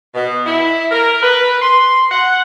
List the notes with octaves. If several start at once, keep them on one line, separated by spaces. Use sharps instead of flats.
B2
E4
A#4
B4
C6
F#5